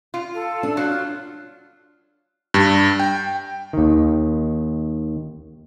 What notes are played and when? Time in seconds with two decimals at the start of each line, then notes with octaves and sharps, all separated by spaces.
0.14 F4
0.34 A4
0.63 D4
0.77 F#3 F5
0.89 F4
2.54 G2
3.00 G5
3.73 D#2 D#3